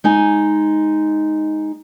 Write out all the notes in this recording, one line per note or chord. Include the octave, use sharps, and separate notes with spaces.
G#3 D#4 G#5